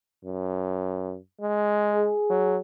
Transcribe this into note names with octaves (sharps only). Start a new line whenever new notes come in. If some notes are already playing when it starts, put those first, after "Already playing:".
F#2
G#3
G#4
F#3